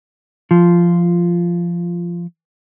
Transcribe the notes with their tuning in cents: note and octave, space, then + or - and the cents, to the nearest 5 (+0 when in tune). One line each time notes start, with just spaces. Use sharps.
F3 -15 F4 -5